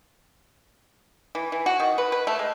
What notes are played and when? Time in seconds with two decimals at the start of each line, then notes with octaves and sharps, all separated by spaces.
1.35 E3
1.52 E3
1.66 F#4
1.80 D#3
1.98 B4
2.12 B4
2.27 A3
2.39 G#3